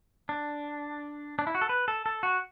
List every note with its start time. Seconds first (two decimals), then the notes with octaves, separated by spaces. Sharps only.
0.29 D4
1.39 D4
1.47 E4
1.55 F#4
1.62 A4
1.69 B4
1.88 A4
2.06 A4
2.23 F#4